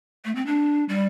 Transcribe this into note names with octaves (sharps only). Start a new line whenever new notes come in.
A3
C4
D4
G3